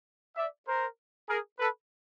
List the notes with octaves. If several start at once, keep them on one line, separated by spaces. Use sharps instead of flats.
D5 E5
A#4 C5
G#4 A#4
A4 B4